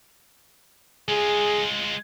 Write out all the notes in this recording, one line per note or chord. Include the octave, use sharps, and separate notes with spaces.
G#3 F4 G#4